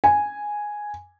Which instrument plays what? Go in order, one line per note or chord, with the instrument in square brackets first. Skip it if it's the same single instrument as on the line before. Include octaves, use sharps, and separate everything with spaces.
[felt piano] G#5